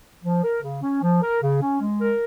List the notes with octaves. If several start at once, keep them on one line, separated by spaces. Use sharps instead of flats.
F3
A#4
C#3
C#4
F3
A#4
C#3
C#4
G#3
A#4